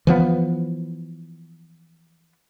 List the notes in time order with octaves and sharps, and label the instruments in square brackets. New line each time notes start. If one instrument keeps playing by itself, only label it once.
[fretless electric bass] E3 F3 B3